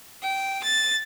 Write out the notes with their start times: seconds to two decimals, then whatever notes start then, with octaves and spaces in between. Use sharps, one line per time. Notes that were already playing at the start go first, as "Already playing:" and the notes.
0.22 G5
0.63 A6